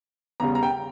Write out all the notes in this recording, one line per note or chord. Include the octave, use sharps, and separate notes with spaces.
E2 C#3 G3 A#5
A#5
G5